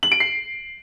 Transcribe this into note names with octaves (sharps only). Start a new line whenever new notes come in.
F#7
D7
C7